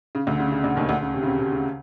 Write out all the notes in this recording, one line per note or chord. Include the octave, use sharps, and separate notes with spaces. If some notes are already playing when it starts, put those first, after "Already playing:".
C#3
D2 D3
C#3
C#3
D2 D3
D#2 D#3
D2 D3
C#3
C3
C#3
C3
C3
C#3